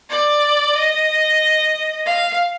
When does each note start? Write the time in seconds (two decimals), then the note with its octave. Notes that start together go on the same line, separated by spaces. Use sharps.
0.10 D5
0.75 D#5
2.06 F5